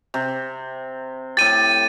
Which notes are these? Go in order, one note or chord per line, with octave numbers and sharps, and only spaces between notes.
C3
A2 G4 A6 D#7